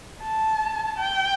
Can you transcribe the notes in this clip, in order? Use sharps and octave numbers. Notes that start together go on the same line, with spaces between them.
A5
G5